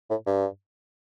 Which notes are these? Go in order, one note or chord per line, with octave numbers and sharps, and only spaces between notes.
A2
G2